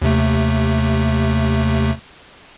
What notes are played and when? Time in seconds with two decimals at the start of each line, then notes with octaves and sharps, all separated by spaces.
0.02 D#2 C3 A3